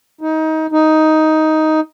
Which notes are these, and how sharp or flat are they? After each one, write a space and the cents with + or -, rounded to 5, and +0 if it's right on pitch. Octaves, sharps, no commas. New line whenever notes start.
D#4 +25
D#4 +10